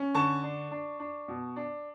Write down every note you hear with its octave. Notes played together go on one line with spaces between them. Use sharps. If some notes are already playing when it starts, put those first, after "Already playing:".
Already playing: C#4
D3 A5 C#6
D4
D4
D4
B2
D4